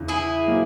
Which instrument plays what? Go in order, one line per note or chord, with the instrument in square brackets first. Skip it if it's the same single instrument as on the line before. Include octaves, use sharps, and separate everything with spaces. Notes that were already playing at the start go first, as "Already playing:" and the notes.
Already playing: [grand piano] E2 C#3 E3
[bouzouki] E4 G#4
[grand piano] B2 F#3 A#3